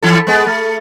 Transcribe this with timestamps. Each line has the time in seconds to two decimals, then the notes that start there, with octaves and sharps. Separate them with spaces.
0.02 E3 E4 A4
0.27 G#3 B3
0.47 A3